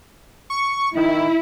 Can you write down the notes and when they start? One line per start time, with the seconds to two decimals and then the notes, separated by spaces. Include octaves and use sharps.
0.50 C#6
0.97 D#3 E4